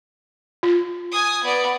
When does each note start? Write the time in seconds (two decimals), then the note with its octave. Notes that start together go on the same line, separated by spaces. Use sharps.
0.63 F4
1.11 G#5 D#6
1.44 B3 D5